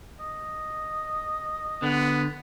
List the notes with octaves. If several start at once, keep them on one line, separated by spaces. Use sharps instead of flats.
D#5
D3 B3